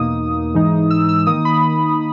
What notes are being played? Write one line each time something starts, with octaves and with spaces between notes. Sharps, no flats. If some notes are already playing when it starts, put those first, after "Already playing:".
Already playing: E2 B2 A#3 D#4 D#6
G#2 E3 G#3 D#4
E6
E6
D#3 A#3 D#4 D#6
B5